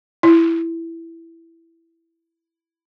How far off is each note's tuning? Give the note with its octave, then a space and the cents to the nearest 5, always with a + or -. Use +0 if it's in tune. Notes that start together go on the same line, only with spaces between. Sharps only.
E4 +5